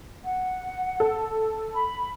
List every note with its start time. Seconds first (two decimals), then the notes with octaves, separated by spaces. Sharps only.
0.24 F#5
1.00 A4
1.74 B5